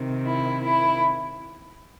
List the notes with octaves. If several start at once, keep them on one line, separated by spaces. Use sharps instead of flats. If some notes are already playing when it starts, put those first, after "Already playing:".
Already playing: C3 D#3
E4
E4